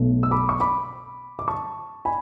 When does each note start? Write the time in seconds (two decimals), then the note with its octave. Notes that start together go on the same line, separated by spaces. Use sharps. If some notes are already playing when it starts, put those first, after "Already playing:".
Already playing: B1 B2 A3
0.23 E6
0.31 B5 D6
0.49 C#6
0.60 B5 D6
1.39 D6
1.48 A5 C#6
2.05 G#5 B5